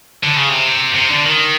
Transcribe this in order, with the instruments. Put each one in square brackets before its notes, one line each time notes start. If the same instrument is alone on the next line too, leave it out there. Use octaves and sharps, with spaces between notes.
[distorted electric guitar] D3
C#3
C3
C3
D3
D#3